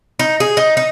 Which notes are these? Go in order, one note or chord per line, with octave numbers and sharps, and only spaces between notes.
D#4
G#4
D#4
D#4